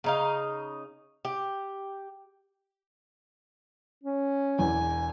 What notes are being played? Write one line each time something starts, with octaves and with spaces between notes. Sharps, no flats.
C#3 D#4 F5
G4
C#4
E1 E2 E3 G#5